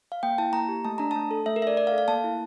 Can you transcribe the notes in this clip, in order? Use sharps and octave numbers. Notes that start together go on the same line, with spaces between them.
F5
A#3 G5
E4 A5
A#3 A#5
G4
A3 A5
D4 A#5
A3 A5
A4
A3 E5
A#4
D4 E5
D5
A3 D5
F5
A4
F5
A#3 A5
E4